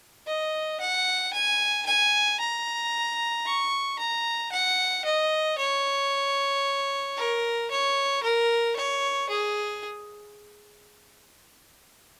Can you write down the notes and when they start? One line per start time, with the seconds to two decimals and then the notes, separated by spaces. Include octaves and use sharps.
0.27 D#5
0.80 F#5
1.33 G#5
1.86 G#5
2.40 A#5
3.46 C#6
3.99 A#5
4.52 F#5
5.05 D#5
5.58 C#5
7.17 A#4
7.71 C#5
8.23 A#4
8.76 C#5
9.29 G#4